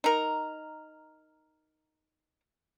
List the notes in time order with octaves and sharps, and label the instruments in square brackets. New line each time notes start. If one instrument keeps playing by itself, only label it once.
[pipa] D#4 A#4